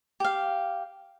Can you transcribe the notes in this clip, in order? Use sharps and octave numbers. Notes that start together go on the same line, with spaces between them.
G4 F5